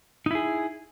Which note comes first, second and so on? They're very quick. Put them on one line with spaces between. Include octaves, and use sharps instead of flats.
D#4 E4 G#4